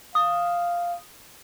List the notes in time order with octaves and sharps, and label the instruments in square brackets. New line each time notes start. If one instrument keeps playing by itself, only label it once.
[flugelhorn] F5 [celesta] D#6